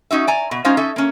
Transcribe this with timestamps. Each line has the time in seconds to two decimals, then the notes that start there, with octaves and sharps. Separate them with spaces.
0.11 C#4 D#4 F#4 E5
0.27 D5 G#5 A#5
0.51 B2
0.65 G#3 C#4 D#4 F4 C5 F5
0.77 C#4 D#4 A4 E5
0.96 A#3 C#4